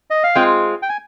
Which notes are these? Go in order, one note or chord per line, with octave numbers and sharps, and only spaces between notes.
D#5
F5
G#3 C4 F4 G5
G5
G#5